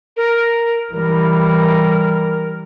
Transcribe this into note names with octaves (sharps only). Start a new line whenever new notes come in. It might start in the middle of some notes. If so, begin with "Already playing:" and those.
A#4
E3 G3 A#4